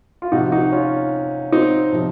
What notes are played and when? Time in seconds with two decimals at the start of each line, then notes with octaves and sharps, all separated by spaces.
0.22 F4
0.32 C3 F3 D#4 F#4
0.52 D#4 F#4
0.72 C#4 F4
1.52 C4 D#4
1.92 C3 F3